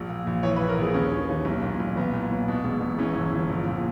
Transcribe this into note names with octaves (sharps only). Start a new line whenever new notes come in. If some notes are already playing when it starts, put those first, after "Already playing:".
Already playing: A#1
A#2
A#1
E3 C#5
B4
A#1
A#4
A#1 G#4
D#2 C#4
D#3
D#2
B1
A#2
B1
B1 B3
A#2
B1
B2
E1
E1
E3 C#4
G1
G1
A#1
A#2